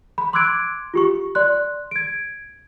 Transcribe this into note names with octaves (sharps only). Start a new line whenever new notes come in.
B5
C6 D6 E6 F#6 G#6 D7
F4 G4 C#6
D5 C6 F#6
G#6 D7